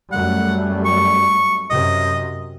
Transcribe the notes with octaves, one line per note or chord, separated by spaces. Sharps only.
F#2 G3 A3 F#5
C#6
F#2 C3 D#5